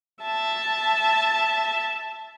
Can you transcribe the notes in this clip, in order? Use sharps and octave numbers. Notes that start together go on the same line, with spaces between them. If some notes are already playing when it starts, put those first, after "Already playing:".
E5 A5